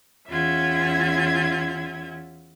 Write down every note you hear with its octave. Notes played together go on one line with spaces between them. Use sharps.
E2 C#4 F4 E5 F#5 G#6